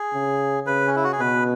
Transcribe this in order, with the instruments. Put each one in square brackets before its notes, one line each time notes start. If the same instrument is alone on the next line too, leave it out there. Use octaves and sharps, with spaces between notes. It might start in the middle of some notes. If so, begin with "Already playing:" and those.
Already playing: [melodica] G#4
[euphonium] C#3
[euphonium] C#3 [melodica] B4
[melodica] C#4
E4
F#4
G#4
[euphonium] B2 [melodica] B4